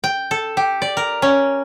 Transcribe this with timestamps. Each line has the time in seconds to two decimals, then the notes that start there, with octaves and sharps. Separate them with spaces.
0.04 G5
0.31 A4
0.57 G4
0.82 D5
0.97 A#4
1.22 C#4